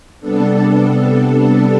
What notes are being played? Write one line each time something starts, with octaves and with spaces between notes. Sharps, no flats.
C3 G3 B3 D4 A4